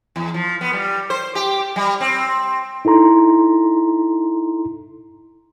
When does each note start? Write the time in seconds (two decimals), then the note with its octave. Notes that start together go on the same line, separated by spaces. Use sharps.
0.16 E2
0.34 F3
0.61 B3
0.73 G3
1.10 C5
1.35 G4
1.76 G3
2.01 C4
2.85 D#4 E4 A4 A#5 C6